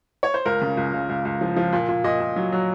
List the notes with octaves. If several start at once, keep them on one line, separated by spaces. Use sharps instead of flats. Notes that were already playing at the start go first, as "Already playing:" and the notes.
C#5
C5
C#2 A#4
C#3
C#2
C#2
C#2
C#2
F3
F3
A#2
A#2
A#2 D#5
A#2
F#3
F#3